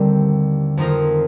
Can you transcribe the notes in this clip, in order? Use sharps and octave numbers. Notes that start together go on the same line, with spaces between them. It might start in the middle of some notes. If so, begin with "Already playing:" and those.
Already playing: D#2 D3 G3 C4
F2 D#3 G#3 D#4 A#4